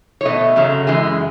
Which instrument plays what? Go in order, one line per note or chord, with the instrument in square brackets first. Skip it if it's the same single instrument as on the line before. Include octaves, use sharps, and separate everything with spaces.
[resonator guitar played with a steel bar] C#5
B2 A3 D#5
F#2 C#3 F#3
F#2 E3 G#3 G#4